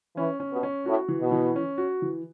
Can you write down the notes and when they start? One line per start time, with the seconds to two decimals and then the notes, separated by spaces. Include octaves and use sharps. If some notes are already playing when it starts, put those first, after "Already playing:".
0.16 E3 C#4
0.40 C#4
0.52 B2
0.63 C#4
0.86 A2 F#4
1.08 E3
1.20 B2
1.32 E3
1.56 C#4
1.78 F#4
2.02 E3